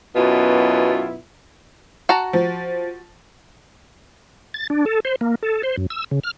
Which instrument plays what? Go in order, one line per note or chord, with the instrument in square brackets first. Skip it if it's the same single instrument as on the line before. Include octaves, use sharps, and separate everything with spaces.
[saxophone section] F#2 B2 B3 E4 F4
[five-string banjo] F#4 A5 A#5
[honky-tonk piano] F3
[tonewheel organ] A6
D4
A4
C5
A#3
A4
C5
F#2
E6
C#3
F6